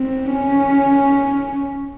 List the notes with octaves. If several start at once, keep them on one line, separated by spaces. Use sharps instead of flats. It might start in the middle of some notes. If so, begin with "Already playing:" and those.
Already playing: C4
C#4